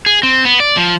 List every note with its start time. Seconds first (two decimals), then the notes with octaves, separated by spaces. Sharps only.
0.06 G#4
0.23 C4
0.45 B3
0.60 D5
0.77 F3